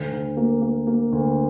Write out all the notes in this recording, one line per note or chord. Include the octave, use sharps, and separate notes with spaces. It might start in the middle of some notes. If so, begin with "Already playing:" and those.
Already playing: D2
D2
A#3
A#3
A#3
D2